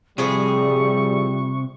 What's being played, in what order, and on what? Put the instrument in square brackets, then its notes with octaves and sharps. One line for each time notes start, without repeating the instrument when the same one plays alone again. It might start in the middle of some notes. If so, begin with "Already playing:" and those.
[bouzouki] A2 F3 G#4 [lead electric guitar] C3 [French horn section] G3 [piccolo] C#6